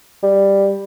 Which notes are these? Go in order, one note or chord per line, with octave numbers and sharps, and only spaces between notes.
G3